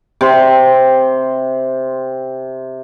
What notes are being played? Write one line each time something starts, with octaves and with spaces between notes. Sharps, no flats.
C3 C6